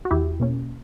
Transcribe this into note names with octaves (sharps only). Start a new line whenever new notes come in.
F#4
E2 E4 G4
B2 A#3 C#4